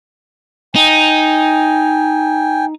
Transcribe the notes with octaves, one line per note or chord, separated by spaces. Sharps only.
D#4 G5 G#5